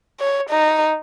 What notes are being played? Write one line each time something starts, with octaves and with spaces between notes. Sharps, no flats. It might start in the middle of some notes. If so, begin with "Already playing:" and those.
C#5
D#4